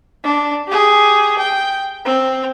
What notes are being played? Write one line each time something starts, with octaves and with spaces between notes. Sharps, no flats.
D4
G4 G#4
G5
C4